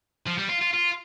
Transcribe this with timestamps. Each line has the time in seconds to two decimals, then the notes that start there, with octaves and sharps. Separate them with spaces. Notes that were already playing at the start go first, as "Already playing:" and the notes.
0.27 F3
0.38 G3
0.50 F4
0.62 F4
0.74 F4